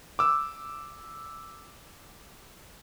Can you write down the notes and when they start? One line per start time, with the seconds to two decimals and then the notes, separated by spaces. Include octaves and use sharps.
0.19 D6 E6